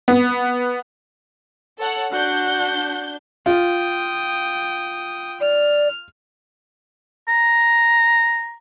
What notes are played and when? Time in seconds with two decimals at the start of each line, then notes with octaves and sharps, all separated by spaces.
0.08 B3
1.79 A4 C#5 F#5
2.12 D4 F#4 F#5 G6
3.46 F4 G5 D#6
5.41 D5 F6
7.28 A#5